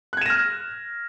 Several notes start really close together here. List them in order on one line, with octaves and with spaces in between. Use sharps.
F#6 G#6 E7 A#6 F6